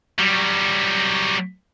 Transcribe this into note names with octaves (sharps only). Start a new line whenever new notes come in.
F#3 G3